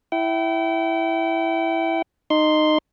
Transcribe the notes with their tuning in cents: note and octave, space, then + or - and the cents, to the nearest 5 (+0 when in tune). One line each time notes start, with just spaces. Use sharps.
E4 +0 G5 -35
D#4 -15 C6 +0